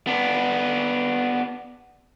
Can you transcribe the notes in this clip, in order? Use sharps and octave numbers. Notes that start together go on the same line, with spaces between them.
B3 D4